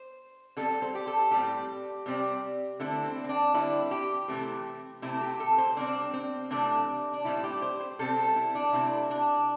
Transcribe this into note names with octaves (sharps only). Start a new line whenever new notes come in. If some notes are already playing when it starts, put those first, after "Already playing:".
Already playing: C5
D3 G3 C4 A4
C5
G4
A4
A2 G3 C4 G4
C3 G3 C4
D3 A3 C4 E4
C4
C4
D4
D3 G3 C4 E4
G4
C3 E3 A3 C4
C3 A3 C4 E4
G4
A4
C5
C3 G3 C4 D4
C4
C3 E3 A3 D4
D4
A2 G3 C4 E4
G4
C5
C5
C3 G3 C4 A4
A4
E4
D4
C3 A3 C4 E4
D4